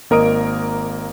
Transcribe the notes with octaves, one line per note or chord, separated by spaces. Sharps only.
G#1 A#3 A#4 D#5 D#6 D7